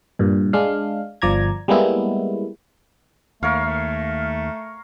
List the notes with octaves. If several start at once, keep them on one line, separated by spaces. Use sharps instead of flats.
G2 A#2
G#3 D4 F5
G1 F3 D5 A#5 G#6
G3 G#3 A#3 B3 E4
D#2 A3 A#4 C#5 F5
A3